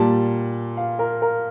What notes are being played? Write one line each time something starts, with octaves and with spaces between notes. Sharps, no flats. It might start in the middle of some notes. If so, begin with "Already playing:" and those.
Already playing: A#2 G3 A5
F5
A#4
A#4